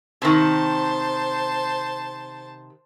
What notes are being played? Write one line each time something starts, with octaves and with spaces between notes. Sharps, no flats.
C3 D#3 C5 A5